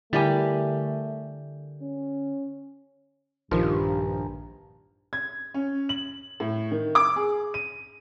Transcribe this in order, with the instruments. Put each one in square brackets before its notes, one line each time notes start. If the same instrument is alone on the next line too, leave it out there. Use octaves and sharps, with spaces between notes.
[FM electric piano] D3 [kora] G3 G4 [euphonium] A3 [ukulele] E4 A#4 G#5
[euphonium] C#4
[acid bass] A#1 [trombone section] G2 [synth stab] D#3 F3
[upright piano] G#6
C#4
F#7
A2
D#3
D6
G#4
D#7